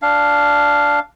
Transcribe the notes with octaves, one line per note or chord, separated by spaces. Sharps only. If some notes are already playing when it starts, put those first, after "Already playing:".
D4 F5